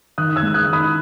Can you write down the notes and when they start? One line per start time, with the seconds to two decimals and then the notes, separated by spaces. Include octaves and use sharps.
0.18 D#3 D#6 F#6
0.36 E6 G#6
0.42 G#3
0.54 D#6 F#6
0.67 D#3
0.73 B5 D#6